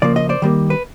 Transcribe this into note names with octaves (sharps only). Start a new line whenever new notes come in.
C#3 F3 A#3 D5
D#5
C5 D5
D#3 G3 A#3
B4